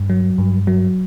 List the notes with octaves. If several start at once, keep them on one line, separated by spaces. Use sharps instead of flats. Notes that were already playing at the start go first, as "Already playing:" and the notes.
Already playing: G2
F#3
G2
F#3